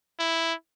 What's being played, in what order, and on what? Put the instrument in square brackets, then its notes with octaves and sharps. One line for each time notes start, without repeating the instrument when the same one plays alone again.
[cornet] E4